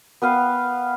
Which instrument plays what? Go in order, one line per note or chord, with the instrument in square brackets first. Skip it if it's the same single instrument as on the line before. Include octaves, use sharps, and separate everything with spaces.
[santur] B3 B4 F5 G5